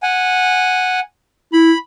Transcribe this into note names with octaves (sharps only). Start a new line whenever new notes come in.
F#5 G#5
E4 B5